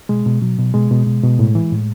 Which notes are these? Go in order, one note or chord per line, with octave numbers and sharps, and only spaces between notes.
B2 G#3
B2
B2 F#3
B2
B2 G#3
B2
B2
B2
A2
E3
A2